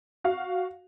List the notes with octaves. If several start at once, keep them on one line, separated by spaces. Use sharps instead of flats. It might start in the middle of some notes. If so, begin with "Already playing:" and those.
F#4 F5